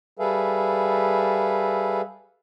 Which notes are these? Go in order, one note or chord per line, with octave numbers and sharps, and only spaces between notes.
G3 G#4 A4 B4 E5 F5